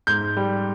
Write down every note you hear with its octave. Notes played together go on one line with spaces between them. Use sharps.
G#2 G6
G3